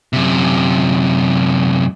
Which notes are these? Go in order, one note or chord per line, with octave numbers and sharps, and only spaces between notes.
F#2 C3